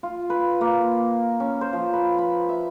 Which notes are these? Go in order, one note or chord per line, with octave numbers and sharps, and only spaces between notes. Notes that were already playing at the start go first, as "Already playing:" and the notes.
F4
B4
A#3
C#4
C5
F3
B4
B5
E5